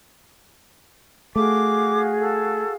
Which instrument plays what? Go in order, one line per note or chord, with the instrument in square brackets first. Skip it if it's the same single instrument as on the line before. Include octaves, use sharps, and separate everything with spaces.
[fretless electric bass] A3 [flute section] F#4 G#4 F5 [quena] D6
[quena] A4